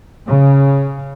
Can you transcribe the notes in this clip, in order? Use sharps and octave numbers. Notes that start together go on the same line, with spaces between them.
C#3